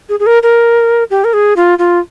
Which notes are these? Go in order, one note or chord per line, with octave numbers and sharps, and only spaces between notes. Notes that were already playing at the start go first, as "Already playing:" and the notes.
G#4
G#4
A#4
A#4
G4
A#4
G#4
F4
F4